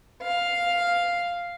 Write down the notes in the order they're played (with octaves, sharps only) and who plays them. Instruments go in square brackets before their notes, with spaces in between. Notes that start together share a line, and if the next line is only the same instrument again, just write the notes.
[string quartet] F5